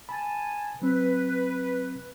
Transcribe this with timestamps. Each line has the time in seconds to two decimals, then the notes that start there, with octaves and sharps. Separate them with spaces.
0.09 G#5 A5 B5
0.82 F#3 C4 B4